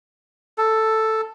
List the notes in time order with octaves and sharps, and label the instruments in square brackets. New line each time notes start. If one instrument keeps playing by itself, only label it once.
[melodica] A4